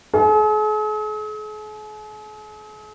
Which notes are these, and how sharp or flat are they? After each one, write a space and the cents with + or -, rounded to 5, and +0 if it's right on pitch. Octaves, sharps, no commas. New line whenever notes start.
G#4 +45